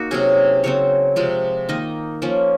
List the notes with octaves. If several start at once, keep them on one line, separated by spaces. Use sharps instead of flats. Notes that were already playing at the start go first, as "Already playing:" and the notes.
Already playing: A#3 D#4 F#4
C3 F#3 C#4 G#4
C#3 F#3 C4 C#5
C3 F3 G#3
D#3 A#3 D#4 D#5
F3 A#3 C#4